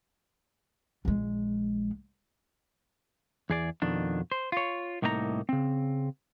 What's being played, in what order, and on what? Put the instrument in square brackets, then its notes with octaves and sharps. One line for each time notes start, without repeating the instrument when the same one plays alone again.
[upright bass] A#1 G#3
[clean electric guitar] E2 G#4 D5
F2 B2 D#3 D4
C5
F4 C#5
C2 A2 A#3 D#4 D#5 A#5
C#3 C4